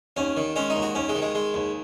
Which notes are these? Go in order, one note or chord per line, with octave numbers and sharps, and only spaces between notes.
D#2 C#4
D#3
G#3 C#4
D#4
D#2
F#4
D#2 C#4
G#3
D#3
G#3
G#3
D#2